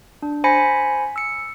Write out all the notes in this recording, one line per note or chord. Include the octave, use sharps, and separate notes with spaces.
D4
C5 G#5 B5 A#6 B6 C#7
E6 C#7